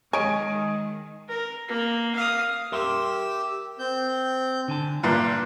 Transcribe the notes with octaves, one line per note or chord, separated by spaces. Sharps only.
D#3 G#3 C#5 D#5 G#5 D7
A#4
A#3
F5 D#6
G4 A#4 E5 C6 E6
C4 G6
D3 G#5 A5
G2 A#2 B4 E5 G5